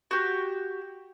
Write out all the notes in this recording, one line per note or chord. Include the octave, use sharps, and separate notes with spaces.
F#4 G4